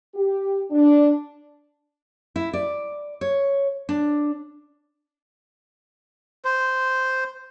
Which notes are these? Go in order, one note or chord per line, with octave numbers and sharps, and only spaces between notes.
G4
D4
E4
D5
C#5
D4
C5